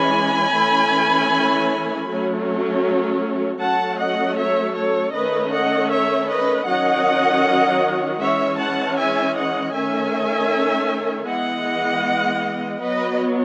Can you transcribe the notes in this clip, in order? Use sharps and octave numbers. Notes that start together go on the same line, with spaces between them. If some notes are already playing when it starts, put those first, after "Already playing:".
Already playing: E3 G#3 C#4 G#5 B5
E3 A3 C#4
F#3 A3 C#4
F#3 A3 C#4 F#5 A5
D#5 F#5
C#5 E5
A4 C#5
D#3 A3 C#4 B4 D#5
D#5 F#5
C#5 E5
B4 D#5
D#3 F#3 C#4 D#5 F#5
E3 G#3 C#4 C#5 E5
F#5 A5
E5 G#5
D#5 F#5
D#3 A3 C#4 E5 G#5
E3 G#3 B3 D#5 F#5
F#3 B3 B4 D#5